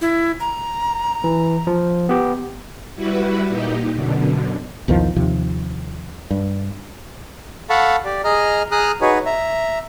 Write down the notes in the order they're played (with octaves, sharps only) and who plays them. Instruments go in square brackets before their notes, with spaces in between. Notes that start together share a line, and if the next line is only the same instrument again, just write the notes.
[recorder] E4
A#5
[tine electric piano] E3
F3
B3 G4
[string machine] G3 E4 F#4 B4
A#2 D#4 G4
F#2 B2 D3
[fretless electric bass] B1 E2 D#3 F3
D#2 C3 F3
G2
[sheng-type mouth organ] A4 F5 F#5 A5 B5 C#6
G4 D5
G#4 D#5 A#5 F6
G#4 A#5 D#6 F6 F#6
D#4 F#4 G#4 B4 C#5
E5 A#5